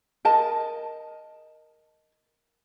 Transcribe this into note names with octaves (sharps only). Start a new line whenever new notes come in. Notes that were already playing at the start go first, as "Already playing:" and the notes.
A#4 D#5 A5